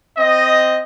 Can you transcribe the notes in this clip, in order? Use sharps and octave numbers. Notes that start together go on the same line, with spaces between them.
C4 D#5